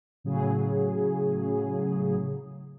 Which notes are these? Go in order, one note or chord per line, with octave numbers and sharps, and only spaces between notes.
A2 C#3 F#3 G#4